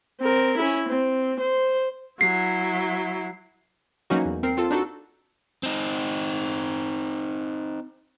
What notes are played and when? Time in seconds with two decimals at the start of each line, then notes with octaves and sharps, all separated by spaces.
0.21 C4 A#4
0.58 C#4 E4
0.89 C4
1.40 C5
2.21 F#3 E4 C7
4.10 E3 F#3 A#3 C#4 D#4 F#4
4.26 E2
4.43 C4 A#4 C7
4.57 C4 F4 A4 A5
4.71 D4 D#4 F#4 A4
5.63 C4 D#4